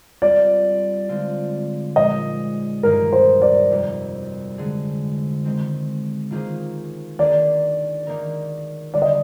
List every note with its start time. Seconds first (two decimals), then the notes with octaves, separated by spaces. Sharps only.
0.22 G3 C4 F4 D5
1.09 D3 G#3 C4 F4
1.96 A#2 F3 G#3 D#4 D#5
2.83 G2 D#3 A#3 D#4 G#4 A#4
3.13 C5
3.42 D5
3.71 F2 C3 G3 A#3
4.58 D3 G#3 D#4 G#4
5.45 D#3 G#3 C4
6.30 D#3 A#3 F4 G#4 C5
7.19 D#3 A#3 D4 G#4 D5
8.07 D#3 A#3 D#4 A#4
8.94 D3 G3 D4 D5
9.02 D#5